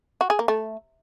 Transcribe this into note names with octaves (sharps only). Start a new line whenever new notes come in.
F#4
G#4
A#3
A3